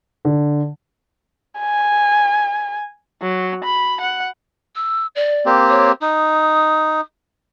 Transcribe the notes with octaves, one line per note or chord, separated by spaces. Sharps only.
D3
G#5
F#3
B5
F#5
E6
D5
A#3 C4 G4
C#5
D#4 D#6